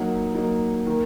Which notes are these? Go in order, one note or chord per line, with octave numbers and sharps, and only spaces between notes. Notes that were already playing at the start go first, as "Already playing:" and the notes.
Already playing: F#3 A#3 D#4 F#5
F#3 A#3 D#4
D#3 A#3